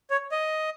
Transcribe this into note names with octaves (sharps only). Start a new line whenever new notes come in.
C#5
D#5